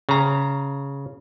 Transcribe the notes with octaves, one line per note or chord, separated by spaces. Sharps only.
C#3 A#5